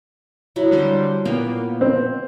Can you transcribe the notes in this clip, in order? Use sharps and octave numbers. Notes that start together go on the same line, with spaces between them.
F#3 E4 F#4
D3 G3 C5
A#2 A#3 B3 G5 A#5
C4